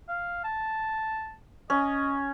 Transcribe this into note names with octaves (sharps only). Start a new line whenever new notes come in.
F5
A5
C#4 D#5